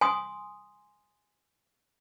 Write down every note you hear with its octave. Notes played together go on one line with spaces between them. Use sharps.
G#5 C6 D#6